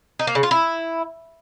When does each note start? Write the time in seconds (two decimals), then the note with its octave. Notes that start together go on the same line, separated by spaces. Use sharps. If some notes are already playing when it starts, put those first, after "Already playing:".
0.19 D#4
0.27 A#3
0.35 C#3
0.43 F4
0.51 E4